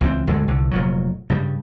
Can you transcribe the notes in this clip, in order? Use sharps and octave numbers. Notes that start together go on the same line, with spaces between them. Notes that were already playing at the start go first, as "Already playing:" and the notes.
C#2 E3 F#3 C4
D2 G2 D3 G#3
C2 D3
F1 A#2 F#3
G2 C#3 G3